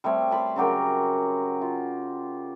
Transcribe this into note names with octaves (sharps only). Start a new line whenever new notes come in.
G3 A3 C4 C#5
C#5 A5 B5 C6
C#3 F#3 G4 A#4
F4